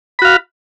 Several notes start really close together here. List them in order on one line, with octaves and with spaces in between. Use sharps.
B5 F#4 F5